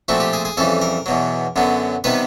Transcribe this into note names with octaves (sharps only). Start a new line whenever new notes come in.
A#2 F3 A3 C4 F#4
G4
G#4
G#4
F2 C#3 E3 G3 A4
A#4
E2 B2 F#3
F#2 D3 F#3 B3
C3 D#3 G3 B3 B4